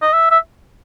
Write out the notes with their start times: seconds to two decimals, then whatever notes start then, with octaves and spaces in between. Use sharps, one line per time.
0.02 D#5
0.13 E5
0.31 E5